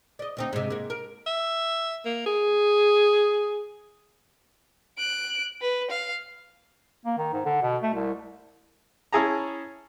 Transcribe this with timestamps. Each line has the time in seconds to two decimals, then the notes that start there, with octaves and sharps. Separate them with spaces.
0.19 D5 D#5
0.37 D2 C4 D#4
0.53 G#2 C3
0.70 G#2 A#3
0.90 A#4
1.26 E5
2.06 A#3
2.26 G#4
4.98 F#6 D7
5.61 B4
5.91 F5
7.05 A#3
7.18 D#3
7.33 G#2
7.45 D3
7.62 B2
7.83 A3
7.94 C2
9.13 C#4 E4 G#4 A5 A#5